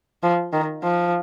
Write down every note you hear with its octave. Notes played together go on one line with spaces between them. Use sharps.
F3
D#3
F3